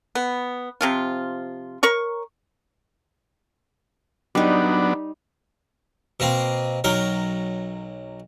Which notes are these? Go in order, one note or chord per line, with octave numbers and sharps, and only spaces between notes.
B3
C3 F3 F4
A#4 C#5 C#6
F#3 G3 B3 D4 D#4
B2 A#3 C4
B1 F#3 A#4 G5